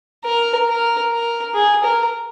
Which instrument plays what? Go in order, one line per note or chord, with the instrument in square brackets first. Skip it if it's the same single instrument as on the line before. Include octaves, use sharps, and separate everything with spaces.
[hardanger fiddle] A#4
A#4
A#4
G#4
A#4